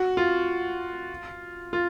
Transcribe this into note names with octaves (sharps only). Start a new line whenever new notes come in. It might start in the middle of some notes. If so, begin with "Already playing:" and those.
Already playing: F#4
F4
F4